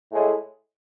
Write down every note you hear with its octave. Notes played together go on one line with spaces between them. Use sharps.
A2 G#3